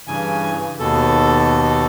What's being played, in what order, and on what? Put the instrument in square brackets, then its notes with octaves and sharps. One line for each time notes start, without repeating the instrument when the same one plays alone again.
[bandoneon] G2 C#3 E3 G#5
D#2 B2 A4